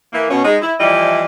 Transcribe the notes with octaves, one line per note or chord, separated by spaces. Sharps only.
E3 A#3
B2 C#4
G#3 D#4
E4
E3 F3 G3 E4 D5 D#5